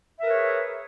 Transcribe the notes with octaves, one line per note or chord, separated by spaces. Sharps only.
G#4 A#4 B4 C#5 E5